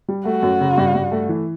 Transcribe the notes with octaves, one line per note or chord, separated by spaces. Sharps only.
G3
A3 F#4
F#2
C#3
G2
G2
A3
E3